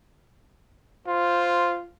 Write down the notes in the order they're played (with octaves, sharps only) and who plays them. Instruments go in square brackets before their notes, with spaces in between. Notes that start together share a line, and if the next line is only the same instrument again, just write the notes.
[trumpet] F4 [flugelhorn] C5